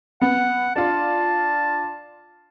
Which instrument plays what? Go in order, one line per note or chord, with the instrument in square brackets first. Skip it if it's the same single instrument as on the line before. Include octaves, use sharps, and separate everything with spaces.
[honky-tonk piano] B3 [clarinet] F#5
[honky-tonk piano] D4 F4 [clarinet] A5